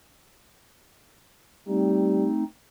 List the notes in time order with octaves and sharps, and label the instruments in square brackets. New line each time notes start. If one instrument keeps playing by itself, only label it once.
[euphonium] G3 [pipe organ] A3 C4 D#4